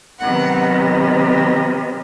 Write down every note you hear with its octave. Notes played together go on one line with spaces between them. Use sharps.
C3 D#3 F#3 B3 F#5